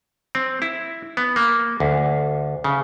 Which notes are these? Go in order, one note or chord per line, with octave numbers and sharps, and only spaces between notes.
C4
E4
B3
A#3
D2
C#3